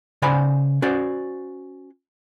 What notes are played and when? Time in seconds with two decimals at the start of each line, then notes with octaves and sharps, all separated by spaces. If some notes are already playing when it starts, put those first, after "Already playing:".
0.22 C#3 C5 D5 F#5 G#5 B5
0.82 C#4 F#4 C5 D5